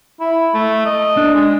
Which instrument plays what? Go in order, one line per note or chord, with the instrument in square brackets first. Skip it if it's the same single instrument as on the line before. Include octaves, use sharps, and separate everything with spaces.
[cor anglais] E4
A3
D#5
[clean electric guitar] D4
[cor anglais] G#3